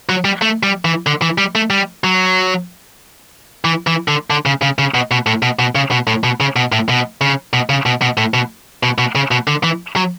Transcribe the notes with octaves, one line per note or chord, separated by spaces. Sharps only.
F#3
G3
A3
G3
E3
D3
E3
G3
A3
G3
F#3
E3
E3
D3
D3
C#3
C#3
C#3
B2
B2
A2
B2
B2
C#3
B2
A2
B2
C#3
B2
A2
B2
C#3
B2
C#3
B2
B2
A2
B2
B2
B2
C#3
B2
D3
E3
F#3